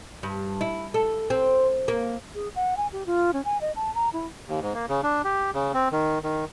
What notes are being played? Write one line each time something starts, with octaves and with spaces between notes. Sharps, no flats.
G2
E4
A4
C4
A#3
G#4
F#5
G#5
G4
F4
C#4
G#5
D#5
A5
A#5
E4
D#2
G#2
A#3
C#3
D4
G4
C#3
C4
D#3
D#3